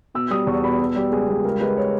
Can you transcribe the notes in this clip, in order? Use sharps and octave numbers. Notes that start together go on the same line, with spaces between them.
B2 E6
G3 D#6
E2 C#6
B2 B5
B2
G3
C#2 G#4
G3
C#2 A#4
G#3 B4
C#5